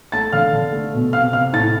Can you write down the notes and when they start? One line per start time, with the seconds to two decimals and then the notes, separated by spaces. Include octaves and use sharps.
0.12 A3 A5 A6
0.33 D3 F5 F6
0.53 D3
0.72 A3
0.94 B2
1.13 C3 F5 F6
1.33 C3 F5 F6
1.53 A2 A5 A6